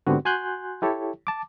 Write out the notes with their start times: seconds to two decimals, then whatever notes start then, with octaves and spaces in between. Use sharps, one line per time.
0.07 G#2 D3 B3 C4 F#4 G4
0.25 F#4 G#5 C6 F#6 G6
0.82 E4 G4 A4 C#5
1.27 A5 D6